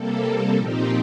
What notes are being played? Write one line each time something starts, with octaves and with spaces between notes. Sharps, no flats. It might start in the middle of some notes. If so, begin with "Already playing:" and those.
Already playing: C3 G3 A#3 A4
A4
A#2 F3 C4 D#4 G4